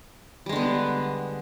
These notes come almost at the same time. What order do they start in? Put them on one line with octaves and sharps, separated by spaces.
G3 G#3 D3 B3